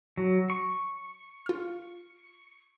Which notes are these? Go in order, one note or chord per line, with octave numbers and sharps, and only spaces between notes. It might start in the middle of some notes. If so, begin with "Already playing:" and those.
F#3
C#6
F4 F6